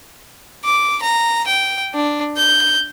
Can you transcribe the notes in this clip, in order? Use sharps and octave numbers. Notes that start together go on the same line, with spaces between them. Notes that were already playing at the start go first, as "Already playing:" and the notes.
D6
A#5
G5
D4
G6